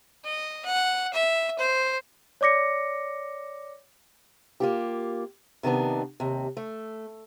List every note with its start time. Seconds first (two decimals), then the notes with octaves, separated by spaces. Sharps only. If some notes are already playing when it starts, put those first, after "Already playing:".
0.25 D#5
0.65 F#5
1.13 E5
1.59 C5
2.41 C#5 D5 D6 A#6 C#7
4.60 A#3 F4 G4
5.63 C3 D#3 B3 D4
6.20 D#2 C3
6.57 A3